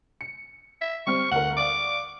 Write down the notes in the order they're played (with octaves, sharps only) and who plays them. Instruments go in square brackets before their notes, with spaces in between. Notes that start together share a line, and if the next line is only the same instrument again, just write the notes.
[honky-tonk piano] C#7
[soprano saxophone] E5
[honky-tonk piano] G3 C4 F6 [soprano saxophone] C#6
[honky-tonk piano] D2 A#4 [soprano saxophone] F#5
[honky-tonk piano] D5 F5 [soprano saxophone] D6